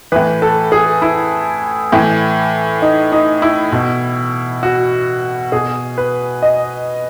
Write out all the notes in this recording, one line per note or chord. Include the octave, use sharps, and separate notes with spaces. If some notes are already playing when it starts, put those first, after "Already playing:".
A2 E3 B4
A4
G#4
E4
A2 E3
D#4
D#4
E4
B2
F#4
B2 G#4
B4
D#5